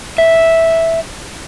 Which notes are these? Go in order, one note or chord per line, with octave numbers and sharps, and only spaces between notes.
E5